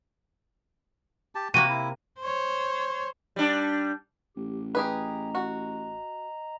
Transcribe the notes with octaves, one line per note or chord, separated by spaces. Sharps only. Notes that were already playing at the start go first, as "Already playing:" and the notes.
G4 A5
C3 A#3 F#4 D#7
E4
C5 C#5
G3 D4
A1 G4
G4 G#4 B4 D#5 A#5
F#4